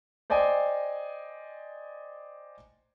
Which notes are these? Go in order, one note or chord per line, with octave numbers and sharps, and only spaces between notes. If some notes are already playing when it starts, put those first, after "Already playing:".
C5 D5 D#5 G5 G#5